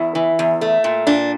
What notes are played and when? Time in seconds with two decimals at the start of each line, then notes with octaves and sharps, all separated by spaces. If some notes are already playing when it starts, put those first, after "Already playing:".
Already playing: E2 E4
0.15 E3
0.39 E2
0.61 A3
0.84 A#2
1.07 A#2 D4